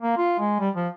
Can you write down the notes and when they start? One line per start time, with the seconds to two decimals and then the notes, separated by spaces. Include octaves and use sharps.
0.02 A#3
0.17 F4
0.39 G#3
0.60 G3
0.75 F3